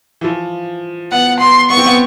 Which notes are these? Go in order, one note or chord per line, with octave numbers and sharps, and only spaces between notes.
E3
F3
B3 F#5
B3 C6
B3 C#6
C4
B3